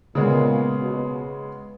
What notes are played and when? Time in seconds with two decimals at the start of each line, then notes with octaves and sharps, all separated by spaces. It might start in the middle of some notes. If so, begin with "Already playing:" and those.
0.15 A#2 C#3 G#3 B3
0.81 B2